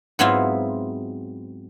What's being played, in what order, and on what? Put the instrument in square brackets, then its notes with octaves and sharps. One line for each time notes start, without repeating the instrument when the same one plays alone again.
[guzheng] G#2 F#3 B3 C4 E4 F4